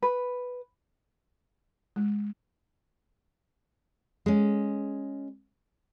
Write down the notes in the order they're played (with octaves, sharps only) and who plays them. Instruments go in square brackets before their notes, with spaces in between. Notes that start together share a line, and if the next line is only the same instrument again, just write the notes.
[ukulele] B4
[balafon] G#3
[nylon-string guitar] G#3 C#4